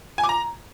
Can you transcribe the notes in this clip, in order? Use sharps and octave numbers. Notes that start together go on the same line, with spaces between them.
G#5
D6
A#5